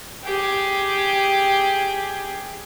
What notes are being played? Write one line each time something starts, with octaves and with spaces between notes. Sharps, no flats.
G4 G#4